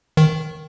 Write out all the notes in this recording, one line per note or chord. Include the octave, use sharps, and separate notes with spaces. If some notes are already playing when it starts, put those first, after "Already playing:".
D#3